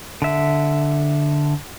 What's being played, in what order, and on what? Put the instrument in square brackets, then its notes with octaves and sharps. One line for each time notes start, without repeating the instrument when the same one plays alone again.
[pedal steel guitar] D3 E5